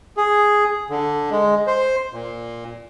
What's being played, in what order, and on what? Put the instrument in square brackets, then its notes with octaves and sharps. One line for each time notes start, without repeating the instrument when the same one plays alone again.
[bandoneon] G#4
D3
G#3
C5
A#2